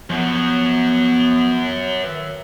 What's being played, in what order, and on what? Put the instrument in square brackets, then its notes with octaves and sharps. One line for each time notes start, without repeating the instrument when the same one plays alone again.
[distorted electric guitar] F#2 F#3 [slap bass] F3 [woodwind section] B3
[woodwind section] D#3 B4 E5